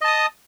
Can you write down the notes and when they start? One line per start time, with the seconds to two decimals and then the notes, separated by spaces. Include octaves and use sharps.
0.01 D#5
0.04 A5
0.07 D#6